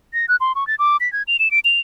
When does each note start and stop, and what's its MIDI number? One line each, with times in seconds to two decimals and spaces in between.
0.14 0.26 94
0.28 0.36 90
0.41 0.52 84
0.55 0.67 85
0.67 0.75 93
0.79 0.97 86
1.00 1.11 95
1.13 1.23 92
1.28 1.37 101
1.39 1.51 100
1.51 1.59 98
1.65 1.80 101